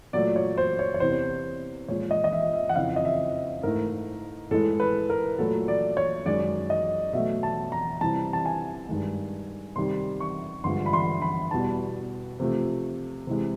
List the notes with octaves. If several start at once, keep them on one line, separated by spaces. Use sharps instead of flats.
A#2 F#3 A3 D5
C#5
C5
C#5
C#5
E2 C3 E3 C5
A#2 F3 G#3 C#5
D#5
D#5
E5
E5
F#5
F2 C#3 E3 F5
D#5
E5
G#2 E3 A3 A#4
A2 E3 G#3 A4
B4
A#4
A#2 F#3 A3 A4
D5
C#5
F#2 D#3 G#3 D5
D#5
B2 F#3 A3 E5
A5
A#5
C3 E3 G3 A5
A5
G#5
G2 D#3 G#3
C3 D#3 G3 C6
C#6
G2 D3 F3 G#3 C6
B5
C6
B5
E2 B2 G3 A5
C3 F3 A3
C3 E3 G#3